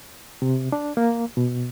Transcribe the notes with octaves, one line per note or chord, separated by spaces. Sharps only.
C3
D4
A#3
B2